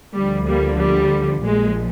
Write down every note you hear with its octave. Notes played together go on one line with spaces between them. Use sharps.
D2 D3 F3 G3
G3 A#3
G3
A#1 A#2 F3 G#3